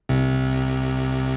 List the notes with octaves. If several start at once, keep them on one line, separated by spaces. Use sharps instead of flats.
C2 C3